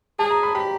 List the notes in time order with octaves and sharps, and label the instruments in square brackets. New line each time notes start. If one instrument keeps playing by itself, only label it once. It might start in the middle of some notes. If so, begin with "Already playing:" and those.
[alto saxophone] G#4 [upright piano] A5
[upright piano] A#5
B5
[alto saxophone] G4 [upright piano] B5